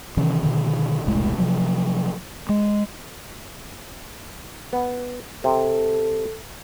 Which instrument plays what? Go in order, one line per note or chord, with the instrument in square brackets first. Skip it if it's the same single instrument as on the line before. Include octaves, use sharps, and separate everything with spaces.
[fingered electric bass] C3 D#3 E3 C#4
B2 D3 D#3
E1 C2 A2 G#3
C3 F3 F#3
G#3
[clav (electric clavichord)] B3
[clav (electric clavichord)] C3 [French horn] A4